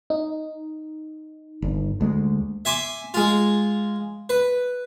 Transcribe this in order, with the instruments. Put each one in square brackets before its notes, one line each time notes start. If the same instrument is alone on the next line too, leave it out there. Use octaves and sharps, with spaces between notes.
[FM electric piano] D#4
[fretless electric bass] G1
D2 G#3
[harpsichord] E5 G#5 C6 D6
G#3 F4
B4